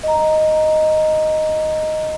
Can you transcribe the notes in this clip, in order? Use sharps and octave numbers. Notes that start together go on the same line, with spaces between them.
D#5 A#5